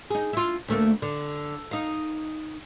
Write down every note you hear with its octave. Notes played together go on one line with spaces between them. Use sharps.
D#4 G#4
E4 F4
D2 A3 A#3
D3
D#4 F5